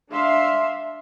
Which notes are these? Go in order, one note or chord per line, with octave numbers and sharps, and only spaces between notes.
D4 E5 F5 C6